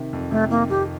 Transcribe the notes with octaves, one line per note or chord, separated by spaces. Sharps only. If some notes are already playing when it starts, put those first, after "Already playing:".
Already playing: C3 D#3
F2
C3 A3
D#3 A#3
F2 G4